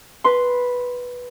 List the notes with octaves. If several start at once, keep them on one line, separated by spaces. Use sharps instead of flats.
B4 C6